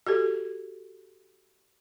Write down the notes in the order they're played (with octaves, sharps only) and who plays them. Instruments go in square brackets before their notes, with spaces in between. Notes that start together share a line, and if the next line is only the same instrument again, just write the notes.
[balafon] F#4 G4 A4